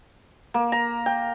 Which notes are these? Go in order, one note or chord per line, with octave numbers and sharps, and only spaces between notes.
A#3
A#5
G5